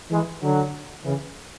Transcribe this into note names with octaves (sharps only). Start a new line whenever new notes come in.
E3 G#3
D3 F#3
C#3 E3